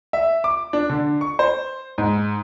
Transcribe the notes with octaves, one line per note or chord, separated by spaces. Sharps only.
E5
D6
D4
D3
C#6
C5
G#2